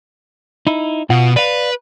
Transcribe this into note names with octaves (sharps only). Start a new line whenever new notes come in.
D#4 E4
B2 F4 F5 F#5
B4 D5 F5